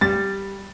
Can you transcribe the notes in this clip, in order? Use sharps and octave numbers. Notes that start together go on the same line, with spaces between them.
G3 A6